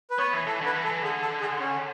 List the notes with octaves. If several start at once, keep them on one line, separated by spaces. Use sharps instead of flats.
B4
B3 C#5
E3
E3 A4
D3 B4
E3
A4
E3
D3 G#4
A4
G#4
C#4